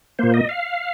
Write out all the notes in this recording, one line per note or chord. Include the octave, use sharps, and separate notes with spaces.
A#2 A#3 C5
D#5
F5